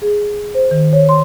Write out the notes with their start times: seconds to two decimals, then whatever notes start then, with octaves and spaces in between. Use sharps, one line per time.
0.02 G#4
0.55 C5
0.71 D#3
0.93 C#5
1.09 C6